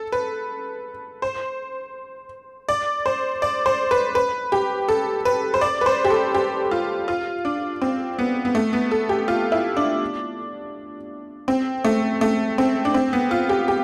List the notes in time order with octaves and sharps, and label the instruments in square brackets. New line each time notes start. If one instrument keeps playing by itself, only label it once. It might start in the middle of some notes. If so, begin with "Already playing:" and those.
Already playing: [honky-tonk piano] A4
B4
C5
D5
C5
D5
C5
B4
B4
G4
A4
B4
C5
D5
B4
C5
G4
A4
G4
F4
F4
D4
C4
B3
B3
A3
B3
A4
G4
F4
E4
D4
C4
A3
A3
C4
D4
C4
B3
F4
G4
G4